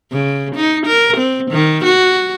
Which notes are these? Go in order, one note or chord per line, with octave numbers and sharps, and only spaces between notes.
C#3
D#4
A#4
C4
D#3
F#4